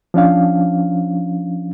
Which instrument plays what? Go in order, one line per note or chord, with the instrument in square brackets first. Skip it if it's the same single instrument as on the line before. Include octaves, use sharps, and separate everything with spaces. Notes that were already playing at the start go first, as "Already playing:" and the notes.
[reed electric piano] F3 C#4 D4 F5